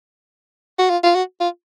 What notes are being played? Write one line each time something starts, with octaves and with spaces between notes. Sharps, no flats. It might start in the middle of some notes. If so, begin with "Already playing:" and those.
F#4
F4
F4
F#4
F4